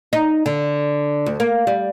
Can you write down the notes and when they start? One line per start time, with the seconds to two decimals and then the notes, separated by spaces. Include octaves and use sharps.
0.13 D#4
0.46 D3
1.26 D2
1.40 A#3
1.67 G3